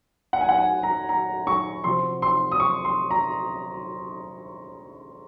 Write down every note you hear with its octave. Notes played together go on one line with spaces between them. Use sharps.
F#5
G#5
F#5
G#5
A#5
A#5
C#6
C3 F3 C4 C6
C6
D#6
C#6
C6
A#5